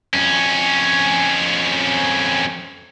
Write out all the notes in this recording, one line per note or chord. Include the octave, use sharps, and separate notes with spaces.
F2 C#4